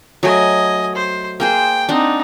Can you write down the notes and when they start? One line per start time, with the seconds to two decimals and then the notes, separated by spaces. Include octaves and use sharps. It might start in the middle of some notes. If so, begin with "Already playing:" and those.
0.23 F#3 A3 D#5 G#5
0.95 C5
1.40 A#3 G#4 C5 G5
1.89 C4 D4 D#4 F#5